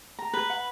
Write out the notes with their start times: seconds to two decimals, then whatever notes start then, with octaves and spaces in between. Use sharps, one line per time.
0.19 A#5
0.33 B4
0.50 F#5